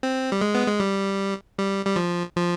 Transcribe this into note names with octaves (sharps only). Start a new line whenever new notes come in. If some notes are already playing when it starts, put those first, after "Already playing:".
C4
G3
G#3
B3
G#3
G3
G3
G3
F3
F3